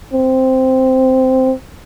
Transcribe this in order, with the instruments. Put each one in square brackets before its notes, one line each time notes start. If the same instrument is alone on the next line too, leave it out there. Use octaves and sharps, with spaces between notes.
[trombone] C4